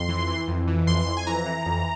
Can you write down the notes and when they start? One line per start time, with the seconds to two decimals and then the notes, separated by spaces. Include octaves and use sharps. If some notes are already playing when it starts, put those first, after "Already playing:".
Already playing: F2 C6
0.09 E3
0.27 E3
0.48 F2
0.67 E3
0.87 F2 C6
1.06 F2
1.17 G#5
1.27 E3 A#5
1.46 E3
1.66 F2